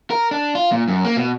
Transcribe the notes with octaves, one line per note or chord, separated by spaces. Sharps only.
A#4
D4
F4
A#2
F#2
A#3
B2